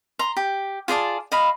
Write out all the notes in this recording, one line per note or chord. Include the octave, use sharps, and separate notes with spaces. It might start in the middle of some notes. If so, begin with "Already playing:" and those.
A#5 C6
G4
F4 G#4 D5 A5
D#5 F5 B5